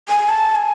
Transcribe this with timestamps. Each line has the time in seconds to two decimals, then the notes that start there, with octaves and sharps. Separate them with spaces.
0.09 G#5
0.29 A5
0.55 G#5